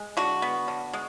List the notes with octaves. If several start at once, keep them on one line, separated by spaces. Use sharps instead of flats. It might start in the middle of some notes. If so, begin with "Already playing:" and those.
Already playing: G#3
D3 F#4
B3
D3
G#3